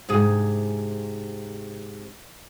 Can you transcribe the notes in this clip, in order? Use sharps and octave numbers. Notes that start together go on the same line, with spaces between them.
G#2 C3 G#4